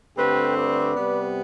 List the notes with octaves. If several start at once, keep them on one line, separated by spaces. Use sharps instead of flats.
G2 D3 A3 C4 G4 B4
B4 D5
C3 G3 B3